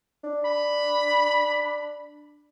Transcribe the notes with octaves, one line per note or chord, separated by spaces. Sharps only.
D4
B5